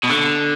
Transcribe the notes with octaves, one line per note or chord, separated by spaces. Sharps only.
B2
D3